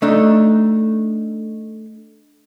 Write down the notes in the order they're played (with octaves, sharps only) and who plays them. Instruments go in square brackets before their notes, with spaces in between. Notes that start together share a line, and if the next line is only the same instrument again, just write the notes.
[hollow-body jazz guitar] A3 D4 D#4